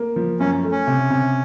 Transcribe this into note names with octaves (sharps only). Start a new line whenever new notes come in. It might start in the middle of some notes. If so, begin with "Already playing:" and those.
Already playing: A#3
F3
F#2 C#4
A3
C#4
C3
C3